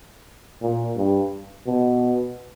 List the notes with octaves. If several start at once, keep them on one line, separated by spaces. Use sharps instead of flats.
A#2
G2
B2